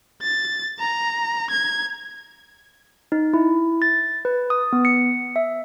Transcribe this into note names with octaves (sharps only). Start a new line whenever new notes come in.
A6
A#5
G#6
D#4
E4
A6
B4
D#6
B3
C#7
E5